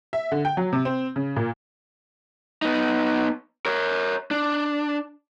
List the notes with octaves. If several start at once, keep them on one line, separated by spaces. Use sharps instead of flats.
E5
D3
G5
F#3
C3
C4
C#3
A#2
B3 D#4
A#4 C#5
D4